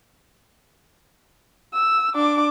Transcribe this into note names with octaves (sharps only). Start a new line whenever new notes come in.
E6
D4 D6